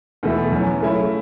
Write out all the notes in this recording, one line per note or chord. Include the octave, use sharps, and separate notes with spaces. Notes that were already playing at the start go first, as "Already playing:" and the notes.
E2 B2 A3 E4
F#2 E3 C#4
C#3 A3 C#4 E4